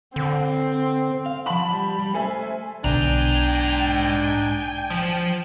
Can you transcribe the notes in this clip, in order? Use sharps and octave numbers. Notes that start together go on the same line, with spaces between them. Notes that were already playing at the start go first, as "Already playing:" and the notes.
D3 C4
F5
F3 F#5 A5 B5 F#7
G3
G3
A3 A4 C5 E5 G#5
B1 G#2 B2 D3 D4 G5 G#5 A#5
F3